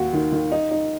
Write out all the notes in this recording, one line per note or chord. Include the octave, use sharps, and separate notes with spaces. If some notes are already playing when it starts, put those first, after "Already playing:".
Already playing: D#2 F#4
D#3
D#3
D#4
D#4